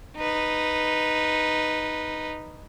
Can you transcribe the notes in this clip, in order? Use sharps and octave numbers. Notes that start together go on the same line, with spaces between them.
D#4 B4